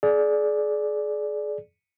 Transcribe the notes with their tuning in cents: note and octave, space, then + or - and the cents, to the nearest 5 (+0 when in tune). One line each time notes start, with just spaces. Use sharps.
G#4 +35 D5 +0